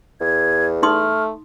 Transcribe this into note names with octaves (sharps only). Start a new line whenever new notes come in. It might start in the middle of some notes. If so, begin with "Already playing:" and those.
E2 G#6
A3 D#4 C6 D#6 F6